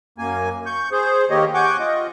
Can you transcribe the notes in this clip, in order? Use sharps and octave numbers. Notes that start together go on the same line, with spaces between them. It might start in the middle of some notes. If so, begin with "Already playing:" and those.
F#2 A#3 G#5
C#6 G6
G#4 C5
D#3 A#3 G4 C#5 D#5
F#5 G#5 C#6 D6 G6
F4 D#5